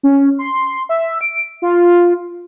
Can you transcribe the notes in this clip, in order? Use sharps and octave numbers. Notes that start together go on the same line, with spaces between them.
C#4
C6
E5
D7
F4